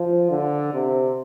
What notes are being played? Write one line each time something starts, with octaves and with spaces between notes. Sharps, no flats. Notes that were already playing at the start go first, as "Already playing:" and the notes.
Already playing: F3
D3
C3